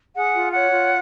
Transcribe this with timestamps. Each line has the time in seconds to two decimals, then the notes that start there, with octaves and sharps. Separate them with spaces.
0.15 G#4 F#5
0.34 F4
0.53 C#5 F#5
0.73 F4